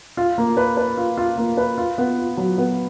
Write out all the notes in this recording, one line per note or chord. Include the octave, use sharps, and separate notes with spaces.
F4
A#3
B4
B4
F4
F4
A#3
B4
F4
B3
F4
F#3
B3